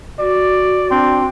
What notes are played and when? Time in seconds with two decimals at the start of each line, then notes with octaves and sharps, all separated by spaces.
0.19 F#4 D5
0.91 C4 D4